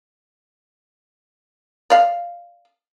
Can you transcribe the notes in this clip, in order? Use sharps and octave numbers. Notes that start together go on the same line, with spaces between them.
D5 F5